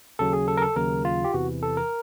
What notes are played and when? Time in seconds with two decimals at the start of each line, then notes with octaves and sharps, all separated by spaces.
0.19 D#2 C#3 F#3 A4
0.33 G#4
0.48 A4
0.57 A#4
0.62 A4
0.76 D#2 C#3 F#3 A#4
1.05 F4
1.24 G4
1.34 E2 C3 E3 F#4
1.63 A4
1.77 A#4